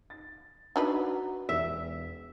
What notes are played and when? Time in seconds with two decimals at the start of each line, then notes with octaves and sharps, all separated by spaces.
0.10 A6
0.76 D4 D#4 F#4 B4
1.49 E1 E5